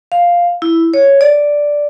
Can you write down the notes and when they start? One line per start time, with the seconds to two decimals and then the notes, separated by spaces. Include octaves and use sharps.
0.12 F5
0.62 E4
0.94 C#5
1.21 D5